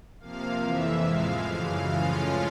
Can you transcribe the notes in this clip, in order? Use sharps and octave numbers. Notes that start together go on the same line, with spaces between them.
C3 F3 A#3 F5
F2 C3 E3 E5
A2 F3 G#3 F5
F#2 C#3 E3
A2 F3 G#3 C#4 F4 F5